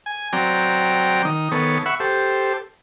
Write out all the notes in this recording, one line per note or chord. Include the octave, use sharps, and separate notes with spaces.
G#5
F#3 C4 D5 G5 A#5
D#3 D#4
D#3 B3 A4 C#5
E5 F#5 B5 C#6
G4 A4 C5